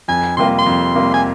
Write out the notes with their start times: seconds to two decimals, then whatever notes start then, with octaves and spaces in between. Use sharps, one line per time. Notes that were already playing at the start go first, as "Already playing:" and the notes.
0.08 F2 G#5
0.37 C3 G3 A#3 F4 C6
0.59 C6
0.66 F2
0.95 C3 G3 A#3 F4
1.14 G#5